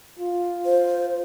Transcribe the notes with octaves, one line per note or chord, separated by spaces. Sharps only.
F4
C5